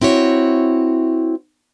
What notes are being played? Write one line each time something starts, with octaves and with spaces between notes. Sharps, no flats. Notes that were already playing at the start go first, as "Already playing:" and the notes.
C4 E4 F#4 C#5